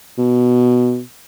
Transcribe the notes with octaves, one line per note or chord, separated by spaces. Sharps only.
B2